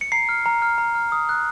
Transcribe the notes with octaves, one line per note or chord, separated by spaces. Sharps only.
C#7
A#5 C7
F6
A#5
F6
A#5
F6
D#6
F#6